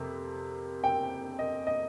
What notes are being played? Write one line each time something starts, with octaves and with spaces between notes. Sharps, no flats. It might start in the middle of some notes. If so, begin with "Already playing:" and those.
Already playing: F2 C3 A#3
G5
D#5
D#5